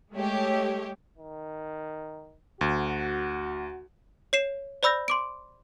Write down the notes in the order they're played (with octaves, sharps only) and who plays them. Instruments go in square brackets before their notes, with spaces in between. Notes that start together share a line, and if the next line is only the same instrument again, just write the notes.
[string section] G#3 A3 G4 C#5
[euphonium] D#3
[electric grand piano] D2 [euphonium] F#4
[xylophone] C#5 C7 E7
C5 D5 B5 E6 G6 A#6
C6 D6 D7